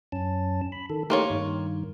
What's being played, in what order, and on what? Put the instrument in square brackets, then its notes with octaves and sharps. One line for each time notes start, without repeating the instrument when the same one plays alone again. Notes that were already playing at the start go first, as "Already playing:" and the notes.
[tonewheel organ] F#2 C#4 A5
B5
D#3 A4
[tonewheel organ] A3 D#4 G4 [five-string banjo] A#3 F4 C#5
[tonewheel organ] G2 D#3